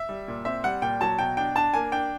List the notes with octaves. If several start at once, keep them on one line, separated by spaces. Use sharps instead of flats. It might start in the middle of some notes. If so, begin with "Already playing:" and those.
Already playing: E5
G3
A#2
C4 E5
G3 F#5
A#2 G5
F#3 A5
B2 G5
D4 G5
D4 A5
A#3 G#5
D4 G5